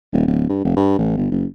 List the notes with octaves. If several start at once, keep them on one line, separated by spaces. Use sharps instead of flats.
D#1
D1
G2
F1
G2
A1
G1
F#1